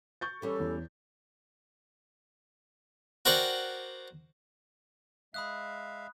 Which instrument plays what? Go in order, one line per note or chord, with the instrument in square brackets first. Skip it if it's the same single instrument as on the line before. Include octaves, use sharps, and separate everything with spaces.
[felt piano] C#6 G6 A6
[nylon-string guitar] E3 G3 C#4 [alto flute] A4
[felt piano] E2
[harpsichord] F#4 A#4 C5 D5 F#5 G5
[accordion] G#3 E5 F5 [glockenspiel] B5 D#6 F#6